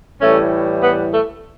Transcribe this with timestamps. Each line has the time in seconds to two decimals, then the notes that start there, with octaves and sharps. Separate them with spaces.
0.20 A2 E3 G3 A3 C#4
0.82 B3
1.12 A3